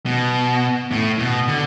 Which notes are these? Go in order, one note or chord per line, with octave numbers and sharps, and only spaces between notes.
B2
A2
B2
D3